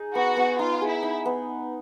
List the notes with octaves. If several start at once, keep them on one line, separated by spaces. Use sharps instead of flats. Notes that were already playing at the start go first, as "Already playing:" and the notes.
Already playing: D#4 G#4
B3 F#4
B3
D#4 F4
G#4
E4
D#4
B3